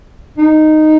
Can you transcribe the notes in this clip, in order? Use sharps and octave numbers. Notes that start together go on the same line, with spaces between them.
D#4